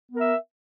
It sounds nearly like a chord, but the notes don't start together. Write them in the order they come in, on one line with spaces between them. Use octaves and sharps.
B3 A#4 E5